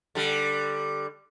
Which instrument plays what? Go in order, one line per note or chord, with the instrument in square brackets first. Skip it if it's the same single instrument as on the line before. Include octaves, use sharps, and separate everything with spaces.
[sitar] D3 G3